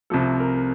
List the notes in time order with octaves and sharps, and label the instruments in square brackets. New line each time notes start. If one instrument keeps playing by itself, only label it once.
[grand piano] C2 C3 F3 A3 A4
A#4